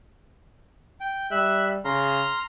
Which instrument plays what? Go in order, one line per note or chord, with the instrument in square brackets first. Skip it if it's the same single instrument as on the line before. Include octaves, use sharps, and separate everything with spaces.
[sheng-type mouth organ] G5
[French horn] G3 [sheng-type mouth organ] E5 F#6
[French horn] C#3 [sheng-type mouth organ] A#5 C6 F6